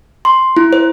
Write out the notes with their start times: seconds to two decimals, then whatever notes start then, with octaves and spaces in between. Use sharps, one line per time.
0.25 C6
0.57 E4
0.73 C5